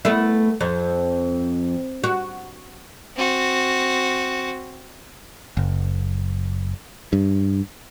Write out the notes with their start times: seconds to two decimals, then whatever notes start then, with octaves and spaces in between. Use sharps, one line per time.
0.05 A3 B3 E4
0.61 F2
2.04 F#4
3.16 C4 F#4
5.57 F#1
7.13 G2